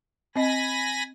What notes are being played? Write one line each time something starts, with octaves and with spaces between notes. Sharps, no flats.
C4 D#5 G#5 B5 A#6